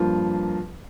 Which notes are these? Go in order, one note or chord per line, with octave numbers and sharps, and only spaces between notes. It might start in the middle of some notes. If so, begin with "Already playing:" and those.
Already playing: G2 F3 A#3 F4